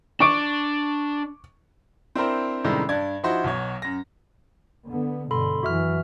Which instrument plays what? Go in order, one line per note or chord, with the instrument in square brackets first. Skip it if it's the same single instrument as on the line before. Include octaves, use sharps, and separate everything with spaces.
[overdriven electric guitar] D4 [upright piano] C#6 D6 D7
[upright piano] C4 D4 E4 A#4 C5
F#2 A2 C3 D#3 G3 G#3
G2 D4 D5 G#6
F3 D#4 E4 F#4 C5
B1 B2 C#5
F#2 A#6
[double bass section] D3 B3
[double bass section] G2 B2 D3 [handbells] A4 B5 C6
[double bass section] F#2 E3 [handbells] F#4 E5 F6